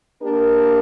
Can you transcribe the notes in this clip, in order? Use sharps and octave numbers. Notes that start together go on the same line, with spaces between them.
A#3 D4 G4 A#4